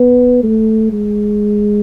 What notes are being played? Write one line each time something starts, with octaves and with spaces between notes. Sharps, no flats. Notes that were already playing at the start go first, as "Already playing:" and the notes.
Already playing: B3
A3
G#3